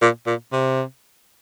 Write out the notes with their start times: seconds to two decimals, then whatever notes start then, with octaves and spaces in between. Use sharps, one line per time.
0.01 A#2
0.27 A#2
0.52 C3